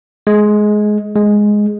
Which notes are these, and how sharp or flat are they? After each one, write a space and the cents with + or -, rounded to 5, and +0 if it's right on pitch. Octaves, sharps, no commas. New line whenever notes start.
G#3 +15
G#3 +0